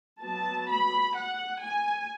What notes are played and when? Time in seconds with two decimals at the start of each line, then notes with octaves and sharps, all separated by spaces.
0.22 F#3 B3 A5
0.68 B5
1.15 F#5
1.61 G#5